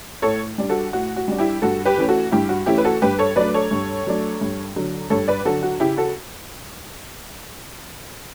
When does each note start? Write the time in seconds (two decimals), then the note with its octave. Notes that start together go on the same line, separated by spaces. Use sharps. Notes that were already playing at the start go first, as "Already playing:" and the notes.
0.22 A2 A4 C#5
0.58 G3 D4
0.69 F#4 A4
0.93 A2 F#4
1.16 F#4
1.28 G3 D4
1.38 E4 G4
1.62 G2 F#4 A4
1.85 G4 B4
1.97 E3 A3 C#4
2.08 F#4 A4
2.31 G2 E4 G4
2.49 F#4
2.66 E3 A3 C#4 E4 G4
2.78 B4
2.85 F#4 A4
3.02 G2 G4 B4
3.19 A4 C#5
3.36 F#3 A3 D4 B4 D5
3.54 A4 C#5
3.71 G2
4.07 F#3 A3 D4
4.41 G2
4.76 D3 F#3
5.10 G2 A4 C#5
5.28 B4 D5
5.45 D3 F#3 F#4 A4
5.63 F#4
5.80 C#3 E4 G4
5.97 F#4 A4